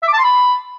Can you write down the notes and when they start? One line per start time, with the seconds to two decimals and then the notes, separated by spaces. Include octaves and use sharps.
0.03 E5
0.08 D6
0.13 A5
0.18 C6
0.24 B5